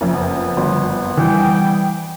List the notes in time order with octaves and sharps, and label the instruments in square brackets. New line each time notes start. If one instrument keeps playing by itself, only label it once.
[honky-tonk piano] F#1 F2
[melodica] B3
[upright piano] G1
[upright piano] E3 [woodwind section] G3 G5